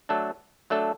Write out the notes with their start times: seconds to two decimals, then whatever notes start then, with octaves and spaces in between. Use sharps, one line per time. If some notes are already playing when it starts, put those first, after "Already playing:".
0.09 F#3 A3 D4 A4
0.70 F#3 A3 D4 A4